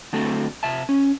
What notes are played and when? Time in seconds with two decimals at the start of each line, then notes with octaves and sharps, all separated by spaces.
0.13 D3 A3 C4 D4 F#4 A4
0.63 C3 E5 A5
0.89 C#4